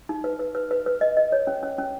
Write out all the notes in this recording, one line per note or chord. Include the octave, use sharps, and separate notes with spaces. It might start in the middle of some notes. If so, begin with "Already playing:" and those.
D#4
B4
B4
B4
B4
B4
D#5
D#5
C#5
C#4
C#4
C#4